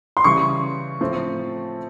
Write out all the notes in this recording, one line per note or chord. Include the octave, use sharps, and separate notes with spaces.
C6
C#3 E3 G3 C#6
A2 F3 A3 C4